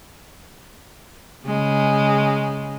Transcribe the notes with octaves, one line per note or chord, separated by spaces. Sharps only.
C#3 G#3